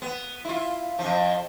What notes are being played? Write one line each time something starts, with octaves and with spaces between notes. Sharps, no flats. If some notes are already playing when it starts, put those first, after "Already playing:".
B3
E4 F4
F2 F3